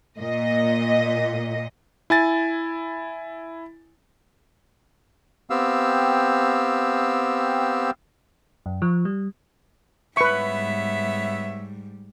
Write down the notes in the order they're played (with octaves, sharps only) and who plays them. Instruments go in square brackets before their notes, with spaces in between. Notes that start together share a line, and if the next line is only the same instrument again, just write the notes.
[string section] A#2 D#5
[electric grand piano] E4 G#5 A6
[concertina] B3 C4 G4 F5 E6
[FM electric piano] F#2
F3
G3
[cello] G#2 G3 [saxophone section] B3 C#5 E5 [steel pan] B4 C#6